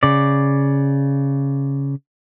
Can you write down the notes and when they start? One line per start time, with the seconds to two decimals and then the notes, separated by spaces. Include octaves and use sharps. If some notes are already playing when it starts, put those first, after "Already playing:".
0.03 C#3 D5